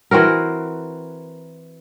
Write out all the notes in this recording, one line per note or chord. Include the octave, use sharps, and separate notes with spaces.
E3 C4 F#4 A#4